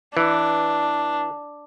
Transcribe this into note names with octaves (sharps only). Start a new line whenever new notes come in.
E3 D4